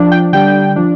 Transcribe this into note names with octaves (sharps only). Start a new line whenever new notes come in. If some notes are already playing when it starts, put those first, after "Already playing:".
Already playing: F3 D4
G5
D3 G3 D4 G5
F3 D4